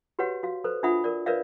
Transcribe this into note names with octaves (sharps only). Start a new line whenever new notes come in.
F#4 G4 B4 C#5 F#5
F#4 F5
A4 B4 C5
D4 F4 E5 F#5 B5 D#6
A#4 D5
A#4 B4 C#5 D5 E5 F5